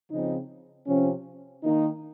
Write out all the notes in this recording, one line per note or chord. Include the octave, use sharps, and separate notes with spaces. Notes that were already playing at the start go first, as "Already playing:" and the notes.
C#3 F3 C4 D#4
C3 F3 C4 C#4
D#3 A#3 D#4